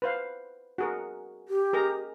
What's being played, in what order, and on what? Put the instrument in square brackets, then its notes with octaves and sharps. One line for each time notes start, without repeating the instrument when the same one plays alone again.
[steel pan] B4 C5 F5
F#4 G#4 A#4
[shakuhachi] G4
[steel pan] G#4 A#4 A#5